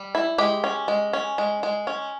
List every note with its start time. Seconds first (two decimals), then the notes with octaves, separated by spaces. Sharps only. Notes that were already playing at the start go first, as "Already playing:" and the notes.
Already playing: G3
0.15 E4
0.38 G#3 G4
0.64 C#4
0.88 G#3
1.13 C#4
1.38 G#3
1.63 G#3
1.87 C#4